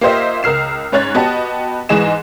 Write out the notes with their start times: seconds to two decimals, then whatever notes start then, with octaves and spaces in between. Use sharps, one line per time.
0.01 A#3 F4 G4 C5 D#5 E5
0.43 C#2 A#4 F6 C7 E7
0.92 G#2 C#4 C#5 F#6 A6
1.15 B3 F#4 G4 D#5 A5
1.89 G#2 E3 G#3 G#4 D#5 E7